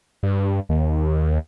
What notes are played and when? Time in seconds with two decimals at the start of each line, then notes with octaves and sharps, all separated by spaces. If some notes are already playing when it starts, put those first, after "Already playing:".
0.23 G2
0.69 D#2